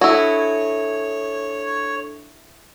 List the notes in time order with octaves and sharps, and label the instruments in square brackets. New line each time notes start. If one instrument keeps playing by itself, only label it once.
[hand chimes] D4 A4 [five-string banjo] E4 F#4 [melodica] C#5